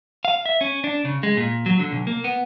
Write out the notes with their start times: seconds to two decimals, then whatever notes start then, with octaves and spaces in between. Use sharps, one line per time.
0.25 F5
0.46 E5
0.61 C#4
0.84 D4
1.05 C#3
1.23 G#3
1.37 A#2
1.66 F#3
1.79 D3
1.92 B1
2.07 A#3
2.24 B3